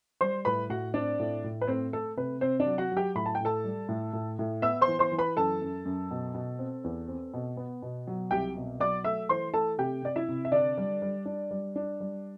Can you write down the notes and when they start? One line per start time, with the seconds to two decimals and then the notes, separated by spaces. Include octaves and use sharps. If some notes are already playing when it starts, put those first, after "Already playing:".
0.21 G3 C5 C6
0.45 A2 B4 B5
0.69 A2 F#4 F#5
0.94 C4 D4 D5
1.19 A2
1.44 A2
1.61 B4
1.68 A3 C4 C5
1.93 A3 A4
2.17 C3 B4
2.41 C3 C4 C5
2.60 D4 D5
2.66 F#3
2.78 F#4 F#5
2.92 F#3
2.97 G4 G5
3.15 A2 B5
3.26 A5
3.35 G5
3.41 A2 A4 A5
3.64 G3
3.89 A2
4.13 A2
4.39 A2
4.62 B3 E5 E6
4.81 C5 C6
4.88 E3
4.99 C5 C6
5.12 E3
5.18 B4 B5
5.37 F#2 A4 A5
5.62 F#2
5.85 F#2
6.11 B2
6.35 B2
6.59 C4
6.84 E2
7.08 C4
7.34 B2
7.57 B3
7.82 B2
8.07 F#3
8.31 C2 G4 G5
8.57 B2
8.80 F#3 D5 D6
9.04 A3 E5 E6
9.29 E3 C5 C6
9.54 A3 A4 A5
9.78 C3 G4 G5
10.03 C3 D5
10.16 E4 E5
10.28 C3
10.45 E5
10.52 D3 D4 D5
10.78 G3
11.02 G3
11.26 D4
11.51 G3
11.76 D4
12.00 G3